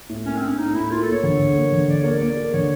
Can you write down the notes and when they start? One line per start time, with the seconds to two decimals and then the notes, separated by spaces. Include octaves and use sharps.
0.09 A2
0.26 A#3 C#4
0.37 C4
0.43 D4
0.48 C#4
0.58 A2 D#4
0.75 A2 E4
0.91 A#3 F4
1.02 A#3 A4
1.12 C#5
1.23 D3
1.39 D3
1.56 A#3
1.72 D3
1.88 D3 D5
2.00 A#3 C#5
2.12 D5
2.20 A#3
2.37 A#3
2.54 D3 C#5